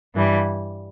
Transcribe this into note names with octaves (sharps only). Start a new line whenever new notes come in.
G2 E3 G3